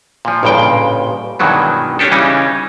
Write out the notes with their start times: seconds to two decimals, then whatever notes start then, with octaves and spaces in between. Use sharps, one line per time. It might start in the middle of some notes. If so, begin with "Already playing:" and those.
0.25 A#2 F3
0.43 A1 G2 A#2 C#3 G5
1.39 G2 B2 D#3 E3 F#3 G#3
1.99 C#4 D4 G4 A4
2.12 C#3 E3 G3 C#4 D#4